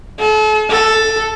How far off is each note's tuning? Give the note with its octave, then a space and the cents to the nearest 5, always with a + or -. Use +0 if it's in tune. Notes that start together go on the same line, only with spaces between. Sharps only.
A4 -40
A4 +5